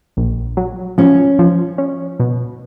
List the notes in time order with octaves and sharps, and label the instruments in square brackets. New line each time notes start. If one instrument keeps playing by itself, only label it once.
[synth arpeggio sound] A#1
F#3
[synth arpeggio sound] F3 [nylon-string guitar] C#4
[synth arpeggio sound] F3
C#4
B2